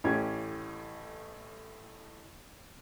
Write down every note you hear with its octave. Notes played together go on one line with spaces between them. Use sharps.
A1 A2 C#4 G4 G#6